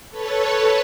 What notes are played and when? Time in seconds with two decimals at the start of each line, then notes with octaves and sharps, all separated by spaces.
0.10 A4 B4 C#5 A5